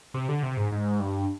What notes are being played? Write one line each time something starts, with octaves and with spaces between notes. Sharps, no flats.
C3
D3
C3
G#2
G#2
G2